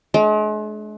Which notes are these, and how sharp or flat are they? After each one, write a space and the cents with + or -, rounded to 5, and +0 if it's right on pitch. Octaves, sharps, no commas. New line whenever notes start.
G#3 +40 D4 +0